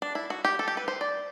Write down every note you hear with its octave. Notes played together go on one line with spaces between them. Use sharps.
D4
E4
F#4
G4
A4
G4
B4
C5
D5